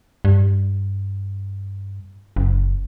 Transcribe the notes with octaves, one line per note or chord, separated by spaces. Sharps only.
G2
F#1